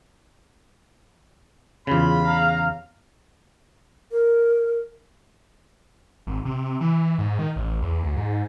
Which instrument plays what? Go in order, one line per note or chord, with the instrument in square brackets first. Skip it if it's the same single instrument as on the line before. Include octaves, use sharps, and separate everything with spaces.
[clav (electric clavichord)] E2 C#3 [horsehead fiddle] F4 [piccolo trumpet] B5
[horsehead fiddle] F5 A#5
[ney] A#4
[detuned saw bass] G#1
C3
E3
G#2
D#3
A1
E2
D2
G#2